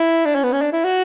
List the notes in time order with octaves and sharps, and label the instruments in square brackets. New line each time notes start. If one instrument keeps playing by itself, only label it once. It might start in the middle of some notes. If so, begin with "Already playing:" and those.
Already playing: [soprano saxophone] E4
D4
C#4
B3
C#4
D4
E4
F#4